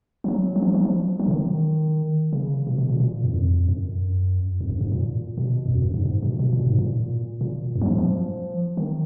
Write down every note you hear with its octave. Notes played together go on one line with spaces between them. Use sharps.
F3
F#3
F#3
F3
F#3
F3
F#3
C#3
D#3
C#3
B2
B2
A#2
A#2
F#2
F2
F#2
F2
F#2
G#2
A#2
B2
F#2
F2
F#2
G#2
G#2
B2
B2
A#2
G#2
A#2
A#2
F#2
F#3
F3
F3
D#3